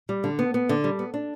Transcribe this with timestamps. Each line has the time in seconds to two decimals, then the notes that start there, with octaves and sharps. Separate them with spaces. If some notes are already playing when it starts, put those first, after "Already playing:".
0.09 G3
0.24 D3
0.39 B3
0.54 B3
0.69 D3
0.84 G3
0.99 B3
1.14 D4